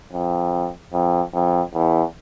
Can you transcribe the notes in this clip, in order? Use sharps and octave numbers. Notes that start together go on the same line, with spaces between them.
F2
F2
F2
E2